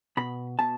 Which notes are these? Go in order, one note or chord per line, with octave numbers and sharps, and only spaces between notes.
B2 B5
B2 A5